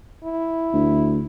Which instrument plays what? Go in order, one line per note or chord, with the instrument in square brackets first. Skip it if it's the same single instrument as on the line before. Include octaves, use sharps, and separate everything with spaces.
[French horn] E4
[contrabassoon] D2